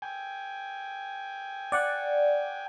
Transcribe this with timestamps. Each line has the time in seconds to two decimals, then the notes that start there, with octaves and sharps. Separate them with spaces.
0.02 G5 G#5
1.72 D5 F#5